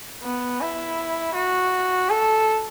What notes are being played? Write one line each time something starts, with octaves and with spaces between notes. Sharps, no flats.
B3
E4
F#4
A4